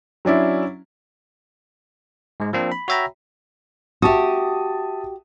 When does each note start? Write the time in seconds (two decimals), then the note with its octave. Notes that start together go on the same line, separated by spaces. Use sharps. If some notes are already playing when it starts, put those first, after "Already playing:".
0.25 F#3 C#4 D4 E4
2.40 G#2 G#3
2.53 F3 A#3 C4 D4
2.72 B5
2.88 F#4 C#5 E5 G5 A#5 B5
4.02 F#4 G4 E5 A5 D#6